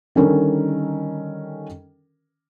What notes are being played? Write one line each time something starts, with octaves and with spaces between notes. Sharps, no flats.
D3 D#3 G3 C#4 A4 A#4